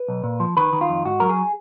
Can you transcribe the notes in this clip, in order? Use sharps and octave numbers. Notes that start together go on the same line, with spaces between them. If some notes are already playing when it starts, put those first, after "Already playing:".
Already playing: B4
B1
A#2
F3
D#3 B4
D#3
F4
F2
G#2 F#4
F#3 A#4
G#4